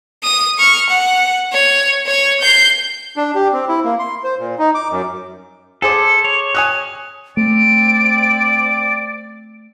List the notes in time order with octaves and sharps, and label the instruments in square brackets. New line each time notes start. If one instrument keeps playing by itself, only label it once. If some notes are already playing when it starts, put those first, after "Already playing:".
[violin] D#6
C#6 F6
F#5
C#5
C#5 C#6
G6 C7
[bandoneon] D4
G4
C4
E4
A#3
C6
C5
A#2
D#4
D6
F#2
[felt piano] G#4 C5 D6 [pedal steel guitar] A4
[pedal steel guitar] C#5
[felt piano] G#5 D#6 F#6
[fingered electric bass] A3 [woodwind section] C4 D5 [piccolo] D7